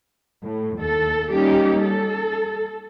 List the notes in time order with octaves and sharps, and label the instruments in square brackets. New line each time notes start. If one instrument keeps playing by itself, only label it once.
[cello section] A2
D#2 A4
G3 A#3 C#4 D#4 G4
A4